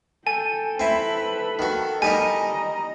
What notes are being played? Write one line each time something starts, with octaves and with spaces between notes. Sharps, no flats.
A4 G5 G#5
C4 E4 B4 B5
D#3 F#4
G3 D#4 A#4 D#5 G#5 A#5